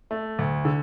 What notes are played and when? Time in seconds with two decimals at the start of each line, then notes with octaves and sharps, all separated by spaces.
0.11 A3
0.39 D2
0.65 D3